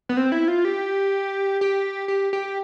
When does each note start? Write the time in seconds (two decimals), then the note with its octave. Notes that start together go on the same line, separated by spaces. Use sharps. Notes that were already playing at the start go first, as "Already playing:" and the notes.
0.09 B3
0.17 C4
0.32 E4
0.48 F4
0.65 G4
1.61 G4
2.08 G4
2.33 G4